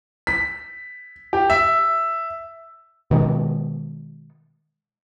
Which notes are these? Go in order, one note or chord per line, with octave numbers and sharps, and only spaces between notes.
B6
G4
E5
B2 D#3 G#3